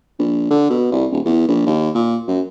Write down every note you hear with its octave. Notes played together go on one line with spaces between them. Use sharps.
A#1
D3
B2
C2
D#1
E2
A#1
D#2
A#2
F#2